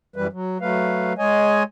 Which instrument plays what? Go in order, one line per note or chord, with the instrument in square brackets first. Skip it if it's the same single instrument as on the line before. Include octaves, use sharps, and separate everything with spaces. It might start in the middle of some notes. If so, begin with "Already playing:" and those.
[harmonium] F#2 E3 G3 B4
F#3
F#3 A3 B4 F5
G#3 C#5 D#5 G#5